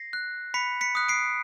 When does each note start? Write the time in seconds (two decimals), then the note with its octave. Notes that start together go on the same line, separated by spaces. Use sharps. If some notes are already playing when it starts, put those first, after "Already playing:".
Already playing: A#6 C7
0.13 F#6
0.54 B5 B6 C#7
0.81 B6 C#7
0.95 D#6 F#6
1.09 C7 D7